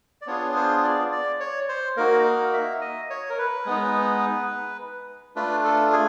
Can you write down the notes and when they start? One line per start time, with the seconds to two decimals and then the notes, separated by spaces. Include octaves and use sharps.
0.22 D5
0.27 B3 D4 F4 G#4 C#5
0.56 C5
0.84 D5
1.12 D5
1.40 C#5
1.69 C5
1.97 A#3 D#4 F#4 A#4
2.24 A#4
2.53 E5
2.81 D#5
3.10 C#5
3.30 A#4
3.39 B4
3.66 G#3 B3 D#4
5.36 A3 D4 F4 B4
5.65 A4
5.93 G#4